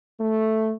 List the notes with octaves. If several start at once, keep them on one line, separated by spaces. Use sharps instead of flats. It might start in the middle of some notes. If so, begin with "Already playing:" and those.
A3